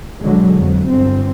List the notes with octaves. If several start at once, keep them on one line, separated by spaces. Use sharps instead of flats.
B2 D3 F#3 G#3
F2 F#3
G1 C4